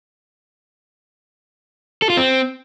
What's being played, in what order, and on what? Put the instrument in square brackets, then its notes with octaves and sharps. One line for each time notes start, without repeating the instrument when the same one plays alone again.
[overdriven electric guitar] A4
F4
C4